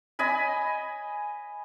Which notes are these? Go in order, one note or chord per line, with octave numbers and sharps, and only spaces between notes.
D#5 G#5 B5